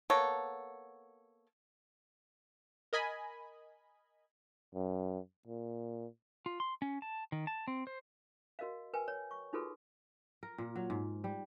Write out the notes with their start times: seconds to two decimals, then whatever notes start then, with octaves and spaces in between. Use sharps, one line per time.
0.10 A#3 B3 A4 C#5
2.93 A#4 D#5 G#5 B5
4.75 F#2
5.47 A#2
6.46 F4
6.60 C6
6.82 C#4
7.02 A5
7.32 D#3
7.47 A5
7.68 C4
7.87 C5
8.59 F#4 A#4 D#5 F5
8.93 A#4 B4 G5 G#5
9.08 C#5
9.31 C#6
9.53 D#4 F4 F#4 G#4 A4 B4
10.43 A#4
10.58 A#2
10.76 F#3
10.90 G#2
11.24 G3